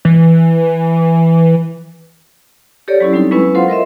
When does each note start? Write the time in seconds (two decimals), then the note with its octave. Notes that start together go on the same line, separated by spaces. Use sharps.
0.05 E3
2.88 G4 A4 C#5 D5
3.00 F#3 C#4 E4
3.13 G3 C4 D#4 A4
3.31 F#3 G#3 B3 C#4 E4 B4
3.55 F4 A4 C5 F5 F#5 C6
3.68 A#4 C5 D#5 E5